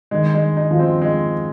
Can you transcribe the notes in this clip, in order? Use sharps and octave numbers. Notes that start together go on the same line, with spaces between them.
D#3 G#3
G#3
D#4
F3
C4
G#3